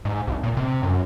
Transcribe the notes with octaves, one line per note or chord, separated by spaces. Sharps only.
G#2
C2
A#2
C3
F#2